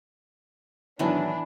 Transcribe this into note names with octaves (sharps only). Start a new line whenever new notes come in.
A2 D#3 E3 F#3 B3 D4